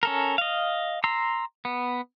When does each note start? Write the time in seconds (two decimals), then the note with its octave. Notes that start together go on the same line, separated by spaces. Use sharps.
0.03 C#4 A4 A#4
0.38 D#5 F5
1.04 A#5 C6 E6
1.65 B3